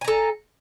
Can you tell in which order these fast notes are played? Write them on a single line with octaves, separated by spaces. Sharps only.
G#5 A#5 A4